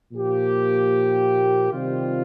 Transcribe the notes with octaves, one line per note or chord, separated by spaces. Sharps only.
A#2 F3 A#3 G4
C3 D#3 G3 C4 F4